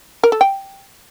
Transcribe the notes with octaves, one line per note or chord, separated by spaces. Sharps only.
A#4
A4
G5